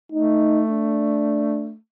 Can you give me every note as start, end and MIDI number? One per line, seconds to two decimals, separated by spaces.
0.12 1.76 57
0.12 0.63 63
0.71 1.71 62